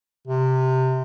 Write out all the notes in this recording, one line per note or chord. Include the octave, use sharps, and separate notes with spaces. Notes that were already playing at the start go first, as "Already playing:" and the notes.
C3